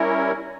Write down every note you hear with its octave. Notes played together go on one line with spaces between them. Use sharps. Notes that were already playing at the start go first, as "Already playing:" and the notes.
Already playing: G3 C#4 E4 A#4 C#5